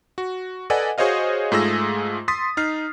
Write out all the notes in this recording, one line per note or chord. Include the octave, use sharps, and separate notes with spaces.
F#4
A4 B4 D5 D#5 F#5 G#5
F#4 G#4 C5 C#5 D#5 F5
G#2 A3 F4 G#4 E6 A#6
C6 D#6 A6 B6
D#4 F6 C7